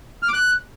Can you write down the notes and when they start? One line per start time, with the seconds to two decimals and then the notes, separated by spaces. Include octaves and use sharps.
0.23 F6
0.28 D6
0.33 F#6